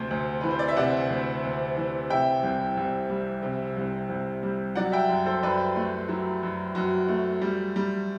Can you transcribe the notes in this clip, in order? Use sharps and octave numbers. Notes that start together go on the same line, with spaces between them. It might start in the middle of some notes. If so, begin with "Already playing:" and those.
Already playing: D2 C3 C5
D2
E3 B4
C5
D5
E5
C3 D5 F#5
D2
D2
E3
C3 E5 G5
C2
C2
G3
C3
C2
C2
G3
F#3 D5 F#5
E5 G5
F#2
A4 C5
F#2 B4 D5
A3
F#3
F#2
F#2 F#4
A3
G3
G3